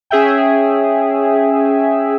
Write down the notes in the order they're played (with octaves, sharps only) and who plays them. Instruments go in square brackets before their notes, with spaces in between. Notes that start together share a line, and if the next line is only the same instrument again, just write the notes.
[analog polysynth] C#4 G#4 E5 G5